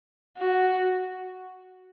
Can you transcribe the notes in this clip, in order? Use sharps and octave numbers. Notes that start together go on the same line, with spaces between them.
F#4